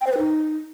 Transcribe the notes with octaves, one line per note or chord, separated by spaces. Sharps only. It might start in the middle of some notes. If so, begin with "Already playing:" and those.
G5
C5
B4
D#4